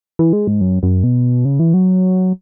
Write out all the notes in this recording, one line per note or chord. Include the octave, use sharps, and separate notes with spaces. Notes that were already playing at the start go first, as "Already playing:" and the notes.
E3
G#3
G#2
F#2
F#2
B2
C#3
E3
F#3